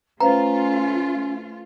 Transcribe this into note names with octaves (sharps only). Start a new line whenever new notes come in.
A3 C#4 F4 B4 C5 F5 A#5